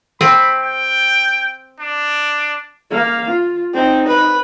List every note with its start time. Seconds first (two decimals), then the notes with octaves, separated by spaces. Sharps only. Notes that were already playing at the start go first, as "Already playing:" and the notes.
0.21 C4 B5
0.62 G5
1.80 D4
2.91 A#3 F5
3.31 F4
3.74 C4 D#4
4.08 B4